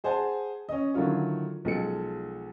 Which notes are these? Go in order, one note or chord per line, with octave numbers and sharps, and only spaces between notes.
G#4 C5 F#5 G#5 A5
C#4 D#5
D3 D#3 F#3 E4 F4 C#5
B1 F3 G#3 A4 C#7